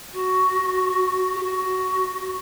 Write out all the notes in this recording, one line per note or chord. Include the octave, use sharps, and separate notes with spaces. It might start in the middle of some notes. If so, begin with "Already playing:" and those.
F#4
G4
F#4